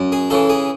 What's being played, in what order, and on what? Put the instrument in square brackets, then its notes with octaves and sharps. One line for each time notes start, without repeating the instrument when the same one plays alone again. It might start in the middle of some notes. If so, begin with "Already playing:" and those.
Already playing: [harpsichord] F#2
G#4
C#3 E3 A4
G#4